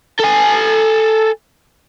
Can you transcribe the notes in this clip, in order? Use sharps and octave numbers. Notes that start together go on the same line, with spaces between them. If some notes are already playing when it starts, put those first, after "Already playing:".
A4 G#5